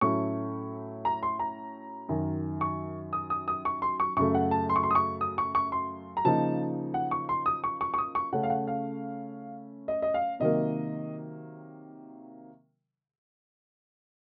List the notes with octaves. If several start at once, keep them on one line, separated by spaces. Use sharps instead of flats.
A2 F#3 A3 C#4 C#6
A#5
C6
A#5
F#2 D#3 F#3
C#6
D#6
D#6
D#6
C#6
C6
C#6
F#2 C#3 A3 C#6
F#5
A5
C6
C#6
C6
D#6
C#6
D#6
C#6
C#6
C6
A#5
C#3 F3 A#3 D#4 A5
F#5
C#6
C6
D#6
C#6
C#6
C#6
D#6
C#6
C#3 A3 C#4 F#5
F5
F#5
F5
D#5
D#5
F5
C3 D#3 F#3 A#3 D#5